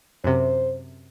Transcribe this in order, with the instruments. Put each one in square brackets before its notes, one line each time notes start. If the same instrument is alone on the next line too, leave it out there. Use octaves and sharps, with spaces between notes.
[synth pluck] F#2 C3 [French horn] C5